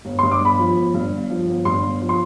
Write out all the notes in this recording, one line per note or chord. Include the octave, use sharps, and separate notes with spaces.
G1
C6
G2
D6
G1 B5
F3
G1
G2
G1
F3
G1
G2 C6
G1
F3
C6